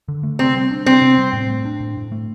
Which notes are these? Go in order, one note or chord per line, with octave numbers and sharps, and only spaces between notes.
D3
A3
C3 C4
G3
D4
C3 C4
C3
G3
A2
A3
D4
A2
A2
A3